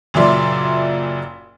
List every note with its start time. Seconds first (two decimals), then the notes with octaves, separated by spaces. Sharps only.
0.14 F#1 A#2 F#3 D5 E5 C6